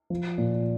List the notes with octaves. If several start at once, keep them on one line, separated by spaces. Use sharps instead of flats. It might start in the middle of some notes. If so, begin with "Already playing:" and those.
F3
A#2